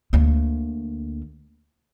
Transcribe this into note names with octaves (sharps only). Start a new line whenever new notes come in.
D2 A#3